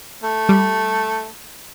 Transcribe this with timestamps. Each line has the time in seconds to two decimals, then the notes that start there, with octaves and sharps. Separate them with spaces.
0.23 A3
0.49 G3